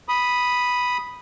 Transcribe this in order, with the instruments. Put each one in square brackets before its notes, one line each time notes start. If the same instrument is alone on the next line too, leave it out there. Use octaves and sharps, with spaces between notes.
[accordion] B5 D#6